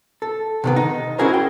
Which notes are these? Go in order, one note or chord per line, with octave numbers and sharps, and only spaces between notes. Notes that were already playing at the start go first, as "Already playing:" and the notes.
A4
C3 D#3 B3
D#4
C#4 E4 F#4 G#4 A#4 C5
G5